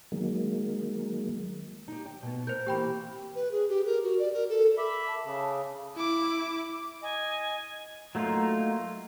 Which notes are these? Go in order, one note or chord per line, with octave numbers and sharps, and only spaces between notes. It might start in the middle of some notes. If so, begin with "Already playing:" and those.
D#3 F#3 G#3 A#3
D#4 G4
G5
B2 B3
A#4 C5 G6
E3 A#3 C4 G4 G5 B5
B4
G#4
G4
A#4
F#4
D5
A#4
A4
E5 B5 D6
A5
C#3
E4 D6
D#5 G#5
F#3 A3 A#3 D#4 F4